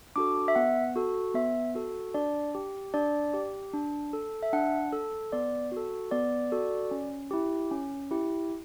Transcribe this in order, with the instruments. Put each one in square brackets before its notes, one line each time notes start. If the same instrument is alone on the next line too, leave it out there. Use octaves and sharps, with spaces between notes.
[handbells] D4 F#4 A4 D6
E5
B3 F#5
F#4 A4
B3 E5
F#4 A4
D4 D5
G4
D4 D5
G4
D4
A4
E5
D4 F#5
A4
B3 D5
F#4 A4
B3 D5
F#4 A4
C#4
E4 G4
C#4
E4 G4